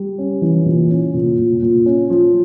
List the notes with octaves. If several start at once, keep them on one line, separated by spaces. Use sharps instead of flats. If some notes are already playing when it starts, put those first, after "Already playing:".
Already playing: G3
C#4
E3
A#2
C#4
A#2
A#2
A#2
C#4
F3